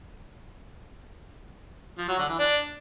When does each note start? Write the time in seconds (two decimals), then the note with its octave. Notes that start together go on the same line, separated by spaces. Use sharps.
1.98 F3
2.08 F#3
2.18 D3
2.28 E3
2.38 D4